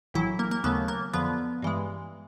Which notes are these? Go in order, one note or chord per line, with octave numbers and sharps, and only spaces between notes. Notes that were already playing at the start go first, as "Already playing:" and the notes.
A#1 A2 E3 F#3 E4
A#3
A#3
D#2 C#3 F#3 A3 B3
A#3
F2 D3 F3 B3
G2 E3 G#3